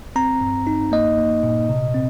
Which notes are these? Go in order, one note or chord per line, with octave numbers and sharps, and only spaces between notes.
C4 A#5
G2
D#4
A#3 D#5
A#3
A#2
C3
C4